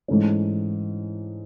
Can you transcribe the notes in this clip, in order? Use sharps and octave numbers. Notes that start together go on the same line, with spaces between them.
G#2 E3 A3 C#4